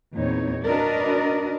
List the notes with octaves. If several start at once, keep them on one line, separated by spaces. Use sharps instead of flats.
E2 A#2 C4 D#4 C#5
D4 F#4 A#4 B4 D5 D#5